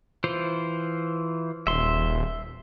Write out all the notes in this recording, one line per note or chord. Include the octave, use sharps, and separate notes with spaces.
E3 F4 C5
D#1 E5 C6